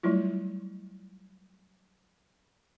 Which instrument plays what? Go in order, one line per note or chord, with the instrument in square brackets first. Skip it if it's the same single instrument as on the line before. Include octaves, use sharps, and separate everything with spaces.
[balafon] F#3 G3 A3 E4 F4